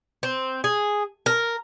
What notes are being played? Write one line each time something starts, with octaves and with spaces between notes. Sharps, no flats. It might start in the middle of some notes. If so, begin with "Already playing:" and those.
C4
G#4
A#4